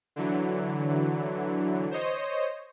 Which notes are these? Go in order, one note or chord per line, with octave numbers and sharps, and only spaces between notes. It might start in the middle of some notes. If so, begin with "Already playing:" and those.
D3 E3 F#3
C5 C#5 D#5